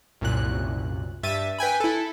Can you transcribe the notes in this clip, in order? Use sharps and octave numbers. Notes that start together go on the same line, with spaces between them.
C2 F#2 A#2 F#6
G2 E5 A6 D#7
B4 G5 G#5 B5
E4 A4